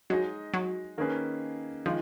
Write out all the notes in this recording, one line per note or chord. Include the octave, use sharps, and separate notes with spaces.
F#3 G#3 D#4 G#4 D#5
F#3
D#3 A#3 C#4 G#4 B4
D#3 F3 G#3